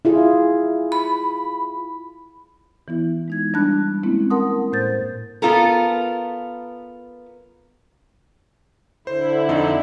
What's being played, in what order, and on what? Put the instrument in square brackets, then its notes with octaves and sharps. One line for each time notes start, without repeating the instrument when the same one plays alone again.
[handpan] E4 F4 G#4
[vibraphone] B5
[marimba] E3 B3 E4
G#3 D#4 G#6
G3 D4 A5 B5 F#6
G#3 A#3 C4 C#4 E4
A#4 F#5 A5 C6 D#6
A2 C5 G6 A6
[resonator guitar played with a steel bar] B3 F4 A4 A#4
[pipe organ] D3 E4 [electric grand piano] C5
[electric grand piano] F2 D#4